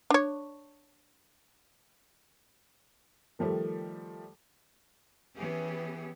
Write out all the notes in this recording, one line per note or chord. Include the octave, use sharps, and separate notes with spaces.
D4 C#5
D#3 F3 G3 A3
E3 B3 C#4 G4 G#4